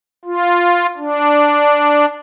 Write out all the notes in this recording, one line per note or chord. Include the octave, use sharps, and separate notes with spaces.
F4
D4